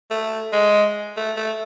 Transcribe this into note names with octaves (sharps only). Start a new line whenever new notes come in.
A3
G#3
A3
A3